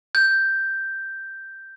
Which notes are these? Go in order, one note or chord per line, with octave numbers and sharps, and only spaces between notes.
G6